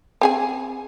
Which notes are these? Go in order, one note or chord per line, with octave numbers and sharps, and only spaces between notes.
C4 G#4 G#5